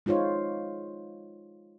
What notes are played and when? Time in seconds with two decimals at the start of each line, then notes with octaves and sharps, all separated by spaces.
0.06 G#3 D#4 F4 C5 C#5